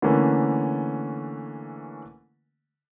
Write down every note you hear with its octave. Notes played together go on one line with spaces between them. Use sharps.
D3 E3 A3 A#3 C#4 B4